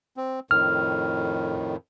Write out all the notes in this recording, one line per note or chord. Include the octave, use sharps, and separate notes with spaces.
C4
F2 A2 D#3 F6